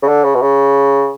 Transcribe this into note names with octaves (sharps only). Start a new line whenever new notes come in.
C#3
D3
C#3
B2
C#3